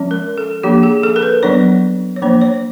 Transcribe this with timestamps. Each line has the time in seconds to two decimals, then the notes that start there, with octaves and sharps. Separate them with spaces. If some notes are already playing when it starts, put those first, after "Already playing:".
Already playing: F3 G#3 C#4
0.11 A#4
0.38 A4
0.63 F3 A#3 D4 G4
0.83 G#4
1.03 A4
1.16 A#4
1.23 B4
1.43 F#3 B3 D4 C#5
2.16 C#5
2.22 F3 A#3 D4 C5
2.42 C#5